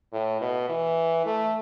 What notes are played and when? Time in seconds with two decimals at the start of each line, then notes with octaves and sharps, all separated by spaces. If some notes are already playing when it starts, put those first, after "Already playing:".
0.13 A2
0.41 B2
0.69 E3
1.26 A3